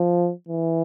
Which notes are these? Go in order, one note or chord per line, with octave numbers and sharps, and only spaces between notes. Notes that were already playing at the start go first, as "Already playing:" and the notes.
Already playing: F3
E3